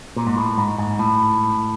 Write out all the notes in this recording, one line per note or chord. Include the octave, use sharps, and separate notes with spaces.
A#2
G#2
A2
G#2
G#2
A2